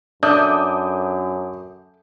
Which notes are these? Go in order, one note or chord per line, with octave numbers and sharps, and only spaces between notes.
F#2 D4 A4 E5 D6 D#6 G6